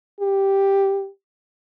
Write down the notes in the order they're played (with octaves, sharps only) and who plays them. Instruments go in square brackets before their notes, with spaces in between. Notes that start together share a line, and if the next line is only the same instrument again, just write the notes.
[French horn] G4